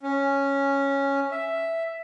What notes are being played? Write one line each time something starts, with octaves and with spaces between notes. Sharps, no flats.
C#4
E5